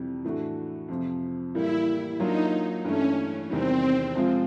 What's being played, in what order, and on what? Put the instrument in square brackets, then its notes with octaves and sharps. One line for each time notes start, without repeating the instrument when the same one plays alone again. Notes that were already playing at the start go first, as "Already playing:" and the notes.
Already playing: [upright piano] F2 C3 E3 G3
A2 E3 A3 D4 F#4
F2 C3 F3
[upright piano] A2 E3 G3 A#3 [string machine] E4
[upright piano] F#3 A#3 D4 F4 [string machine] D#4
[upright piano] G2 E3 A3 [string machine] C#4
[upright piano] E2 C3 D#3 G3 [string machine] C4
[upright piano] C3 F3 G#3 C4 F4